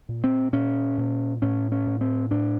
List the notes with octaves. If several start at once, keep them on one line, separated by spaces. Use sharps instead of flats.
A#2
C4
A#2 C#4
A#2
A2 C#4
C#4
A2
C4
A2 D4